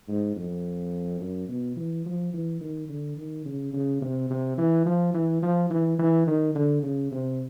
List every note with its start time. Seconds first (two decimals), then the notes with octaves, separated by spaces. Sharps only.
0.08 G#2
0.36 F2
1.21 F#2
1.49 B2
1.76 E3
2.05 F3
2.34 E3
2.61 D#3
2.89 D3
3.17 D#3
3.46 C#3
3.73 C#3
4.01 C3
4.30 C3
4.58 E3
4.86 F3
5.14 E3
5.42 F3
5.70 E3
5.99 E3
6.27 D#3
6.55 D3
6.83 C#3
7.12 C3